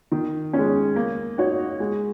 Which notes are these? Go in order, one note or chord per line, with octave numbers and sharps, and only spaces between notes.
D#3
G#3 C#4
A#3
D#4 F#4 C#5
G#3